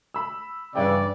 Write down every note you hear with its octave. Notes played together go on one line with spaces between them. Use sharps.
B5 E6
G2 C#3 E3 D5 G5